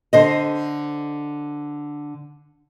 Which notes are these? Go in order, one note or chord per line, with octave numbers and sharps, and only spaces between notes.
D3 C5 D#5